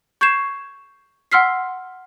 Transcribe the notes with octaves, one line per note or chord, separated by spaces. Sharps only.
C#6 G6 G#6 C7 E7
F#5 C6 E6 F6 B6 C7